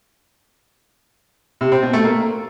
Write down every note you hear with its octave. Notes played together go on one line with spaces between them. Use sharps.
C3
C4
B2
A3
A#3